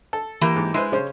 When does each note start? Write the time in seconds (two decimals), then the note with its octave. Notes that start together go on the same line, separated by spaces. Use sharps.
0.13 A4
0.41 E3 A#3 G4
0.56 G#2
0.74 G#3 E4 B4 C5
0.92 C#3 C#4 C5